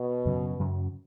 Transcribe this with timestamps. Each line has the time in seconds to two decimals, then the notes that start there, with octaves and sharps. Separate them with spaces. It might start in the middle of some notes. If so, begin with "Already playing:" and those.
Already playing: B2
0.25 F#2 C#3 F#3
0.59 F#2 C#3 F#3